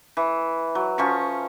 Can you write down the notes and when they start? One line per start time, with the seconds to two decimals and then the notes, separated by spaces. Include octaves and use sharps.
0.17 E3
0.75 F#3
0.98 F3 C#4 C#6